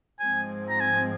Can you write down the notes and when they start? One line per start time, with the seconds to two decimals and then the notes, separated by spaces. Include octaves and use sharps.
0.20 G#2 F3 G#3 C4 G#5
0.69 A#5
0.80 G#5